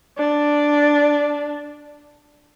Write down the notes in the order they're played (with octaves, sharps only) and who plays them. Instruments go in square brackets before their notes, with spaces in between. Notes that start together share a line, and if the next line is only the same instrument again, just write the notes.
[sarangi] D4